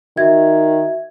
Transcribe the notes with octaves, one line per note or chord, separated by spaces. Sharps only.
D#3 F#4 E5 G#6